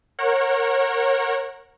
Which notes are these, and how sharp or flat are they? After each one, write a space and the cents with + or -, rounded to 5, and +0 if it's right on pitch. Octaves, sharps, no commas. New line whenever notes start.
A#4 +0 C#5 -30 F#5 -5